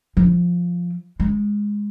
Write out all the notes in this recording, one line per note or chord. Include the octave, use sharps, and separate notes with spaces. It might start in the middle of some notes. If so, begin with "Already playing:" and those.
F3
G#3